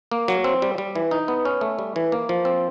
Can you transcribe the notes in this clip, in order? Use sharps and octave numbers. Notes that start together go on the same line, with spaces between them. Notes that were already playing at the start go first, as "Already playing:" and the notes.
A#3
F#3
C4
G3
G3
E3
D#4
B3
C#4
A3
G3
E3
A#3
F3
C4